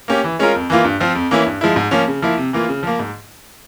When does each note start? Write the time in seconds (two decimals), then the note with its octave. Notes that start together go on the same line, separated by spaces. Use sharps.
0.08 A#3 C#4 G4
0.24 E3
0.39 G#3 C#4 F4 A#4
0.55 F2
0.70 E3 A#3 F4
0.84 G2
1.00 F3 C4 F4
1.15 F2
1.31 E3 A#3 C#4 E4
1.46 G2
1.61 F3 G#3 E4
1.76 G#2
1.91 F3 A#3 C#4
2.08 C#3
2.22 F3 A#3 E4
2.38 C3
2.53 E3 A#3 F4
2.69 C#3
2.83 F3 A#3
2.99 G#2